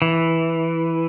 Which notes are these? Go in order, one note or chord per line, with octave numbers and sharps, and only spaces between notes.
E3